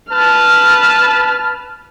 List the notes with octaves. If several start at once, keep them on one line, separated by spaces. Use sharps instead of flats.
B4 A5 F6